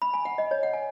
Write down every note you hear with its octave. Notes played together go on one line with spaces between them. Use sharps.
B5
G#5
F#5
D#5
C#5
F#5
G#5